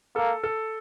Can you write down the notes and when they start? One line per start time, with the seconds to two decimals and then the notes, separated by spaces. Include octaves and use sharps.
0.16 A#3 A4
0.44 A4